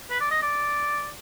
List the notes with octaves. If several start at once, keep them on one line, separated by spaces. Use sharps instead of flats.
B4
D5
D#5
D5